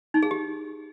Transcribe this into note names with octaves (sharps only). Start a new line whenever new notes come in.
D#4
G#4
G4